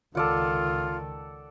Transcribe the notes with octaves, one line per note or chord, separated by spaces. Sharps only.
C#2 D#3 F4 A4 D5 F#5